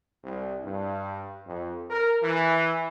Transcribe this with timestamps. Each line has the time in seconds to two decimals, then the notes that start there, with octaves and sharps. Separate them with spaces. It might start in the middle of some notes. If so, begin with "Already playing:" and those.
0.24 C2
0.64 G2
1.47 F2
1.91 A#4
2.23 E3